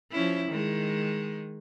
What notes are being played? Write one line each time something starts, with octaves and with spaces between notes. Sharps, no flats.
F3 C#4 E4
D#3 G#3